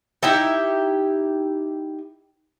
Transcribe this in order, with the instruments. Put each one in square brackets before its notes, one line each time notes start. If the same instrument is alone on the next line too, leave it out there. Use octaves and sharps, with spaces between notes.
[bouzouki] D#4 E4 G4 E5